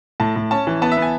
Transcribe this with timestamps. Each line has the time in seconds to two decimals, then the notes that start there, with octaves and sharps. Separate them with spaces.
0.20 A2 A5
0.36 A2
0.51 C#4 A5
0.67 E3
0.82 B3 A5
0.92 E5
0.97 B3
1.02 G#5